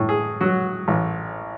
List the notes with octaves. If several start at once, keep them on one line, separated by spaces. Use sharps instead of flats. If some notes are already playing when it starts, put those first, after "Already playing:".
Already playing: A2
G#4
F#3 F#4
A1